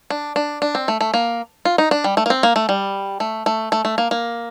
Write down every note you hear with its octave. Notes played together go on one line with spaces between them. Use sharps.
D4
D4
D4
C4
A3
A3
A#3
F4
D#4
D4
G3
A3
A#3
C4
A#3
A3
G3
A3
A3
A3
A3
A#3
A#3